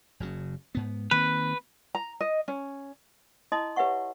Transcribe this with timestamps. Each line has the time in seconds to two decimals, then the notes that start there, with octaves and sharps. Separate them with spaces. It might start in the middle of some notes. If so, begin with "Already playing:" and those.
0.20 F#1 C#3 F#3
0.75 G#2 B3
1.11 D#3 A#3 C4 B4
1.95 A#5
2.21 D#5
2.48 C#4
3.52 E4 D#5 A5 C6 D#6
3.76 G4 B4 C#5 E5 F#5 C#6